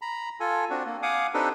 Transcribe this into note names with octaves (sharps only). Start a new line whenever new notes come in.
A#5 B5
F4 A4 G#5
C4 D4 F#4
A#3
F5 F#5 G#5 D6 D#6
C4 D4 D#4 G4 A4 B4